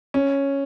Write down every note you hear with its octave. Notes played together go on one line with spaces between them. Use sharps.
C#4